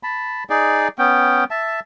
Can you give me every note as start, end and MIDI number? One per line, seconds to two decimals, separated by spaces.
0.03 0.44 81
0.03 0.44 83
0.50 0.88 63
0.50 0.88 68
0.50 0.88 74
0.98 1.44 59
0.98 1.44 61
0.98 1.44 79
1.50 1.80 76
1.50 1.80 81